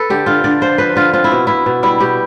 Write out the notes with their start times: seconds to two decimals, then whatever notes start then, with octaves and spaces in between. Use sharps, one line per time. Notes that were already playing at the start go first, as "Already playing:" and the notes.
Already playing: A4 B4
0.10 D3 G4
0.26 D3 F4
0.44 D3 D5
0.61 F3 C5
0.78 F3 B4
0.96 D3 F4
1.14 C4 F4
1.24 E4
1.31 B2
1.47 B2 E4
1.66 B2
1.83 G3 E4
2.00 B2 G4